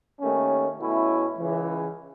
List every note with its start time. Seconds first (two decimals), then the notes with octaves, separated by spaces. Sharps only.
0.19 D#2 D#3 A3 C#4
0.78 B2 A3 C#4 E4
1.38 C#2 C#3 E3